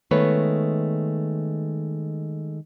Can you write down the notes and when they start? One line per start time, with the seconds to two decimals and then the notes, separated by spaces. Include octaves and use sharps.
0.11 D#3 G#3 A3 B3 B4 C#5